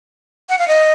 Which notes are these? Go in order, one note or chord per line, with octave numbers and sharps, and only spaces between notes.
F#5
F5
D#5